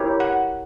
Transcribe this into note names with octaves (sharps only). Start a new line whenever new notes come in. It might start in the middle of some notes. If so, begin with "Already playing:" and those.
Already playing: E4 G4 A#4 C#5
F#5